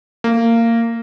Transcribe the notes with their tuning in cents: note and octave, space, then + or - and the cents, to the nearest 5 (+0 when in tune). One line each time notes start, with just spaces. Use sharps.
A#3 -20